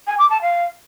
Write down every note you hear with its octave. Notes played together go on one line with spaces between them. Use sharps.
G#5
D6
A5
F5